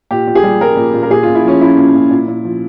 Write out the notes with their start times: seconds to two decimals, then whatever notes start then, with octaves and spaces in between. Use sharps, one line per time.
0.11 A#2 G4
0.27 A#2
0.35 G#4
0.43 G3
0.61 G3 A#4
0.77 A#2
0.94 A#2
1.03 A#4
1.10 A#2 G#4
1.23 A#2 F4
1.35 E4
1.45 F3 C#4
1.61 F3 E4
1.77 A#2
1.94 A#2
2.11 A#2
2.28 A#2
2.45 F3